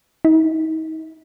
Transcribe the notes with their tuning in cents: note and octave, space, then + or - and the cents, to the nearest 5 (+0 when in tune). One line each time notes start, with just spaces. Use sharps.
D#4 +35